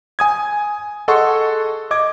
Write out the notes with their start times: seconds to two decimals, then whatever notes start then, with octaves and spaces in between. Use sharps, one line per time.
0.19 G#5 D#6 G#6
1.08 G#4 A4 D#5 F#5 C6 C#6
1.91 D#5 D6 G#6